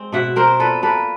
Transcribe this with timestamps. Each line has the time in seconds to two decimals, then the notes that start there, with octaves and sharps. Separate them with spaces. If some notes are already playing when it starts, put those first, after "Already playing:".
Already playing: G#3 C4
0.12 B2 E5 F#5
0.36 C4 A#4 C5
0.59 A#2 A4 B4
0.82 A#3 A4 B4